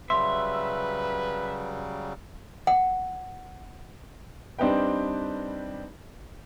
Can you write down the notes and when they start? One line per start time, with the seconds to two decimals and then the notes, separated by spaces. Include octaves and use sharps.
0.10 C#3 F#3 G3 B4 E5 C6
2.67 F#5
4.59 G3 C4 D4 D#4 B4 G5